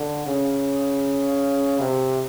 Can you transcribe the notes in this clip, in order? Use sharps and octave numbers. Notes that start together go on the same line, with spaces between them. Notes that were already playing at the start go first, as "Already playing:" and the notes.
Already playing: D3
C#3
C3